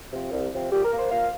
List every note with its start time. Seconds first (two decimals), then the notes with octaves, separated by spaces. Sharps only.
0.12 C3 F3 C4
0.32 C2
0.52 C3 F3 C4
0.71 A#2 G4
0.84 A#4
0.92 A#3
0.97 C5
1.11 A#2 F5